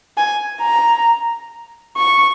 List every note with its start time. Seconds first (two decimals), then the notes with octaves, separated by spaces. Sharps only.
0.17 G#5
0.62 A#5
1.97 C#6